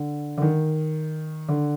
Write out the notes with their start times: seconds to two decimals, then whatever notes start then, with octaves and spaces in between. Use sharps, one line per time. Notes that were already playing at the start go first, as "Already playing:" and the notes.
Already playing: D3
0.38 D3
0.42 D#3
1.49 D3